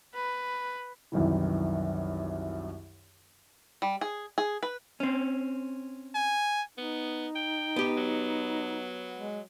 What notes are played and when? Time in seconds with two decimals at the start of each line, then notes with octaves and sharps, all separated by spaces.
0.14 B4
1.12 C2 F#2 D#3 E3
3.82 G3
4.01 G#4
4.38 G#4
4.63 B4
5.00 C4 C#4
6.15 G#5
6.78 B3 D#4
7.35 G5
7.76 B3 G4
7.97 F#3
9.17 G#3